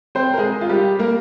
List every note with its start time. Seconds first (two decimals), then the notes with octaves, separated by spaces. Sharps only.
0.15 C4 C5
0.34 A#4
0.38 G#3 G#4
0.61 F4
0.69 G3 G4
0.99 A#3 A#4